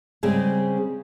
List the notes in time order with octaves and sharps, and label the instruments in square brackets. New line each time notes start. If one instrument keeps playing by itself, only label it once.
[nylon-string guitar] C#3 G3 G#3 C4 G#4